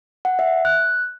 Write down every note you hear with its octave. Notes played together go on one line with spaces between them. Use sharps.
F#5
E5
F#6